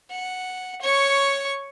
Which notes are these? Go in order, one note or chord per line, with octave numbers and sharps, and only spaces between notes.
F#5
C#5 C#6